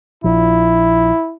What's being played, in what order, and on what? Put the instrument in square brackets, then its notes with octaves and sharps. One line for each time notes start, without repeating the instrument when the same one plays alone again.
[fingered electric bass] A#1 F3 [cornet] E4